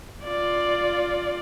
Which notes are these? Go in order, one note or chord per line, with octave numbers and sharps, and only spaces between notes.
F4 D5